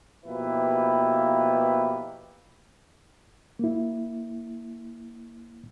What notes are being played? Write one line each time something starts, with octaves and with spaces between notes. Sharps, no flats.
B2 F3 A#3 E4 G4 B4
A#3 E4